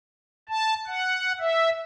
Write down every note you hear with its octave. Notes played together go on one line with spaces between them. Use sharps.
A5
F#5
E5